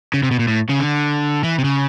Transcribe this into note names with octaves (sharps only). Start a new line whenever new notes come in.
C#3
C3
B2
A#2
A2
C#3
D3
E3
C3
C#3